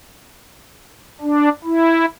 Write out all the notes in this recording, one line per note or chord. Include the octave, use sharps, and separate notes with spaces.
D4
E4